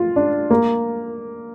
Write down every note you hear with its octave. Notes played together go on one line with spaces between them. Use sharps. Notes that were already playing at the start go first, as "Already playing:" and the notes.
Already playing: F4
D4
A#3